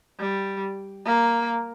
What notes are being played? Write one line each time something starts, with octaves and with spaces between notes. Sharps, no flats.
G3
A#3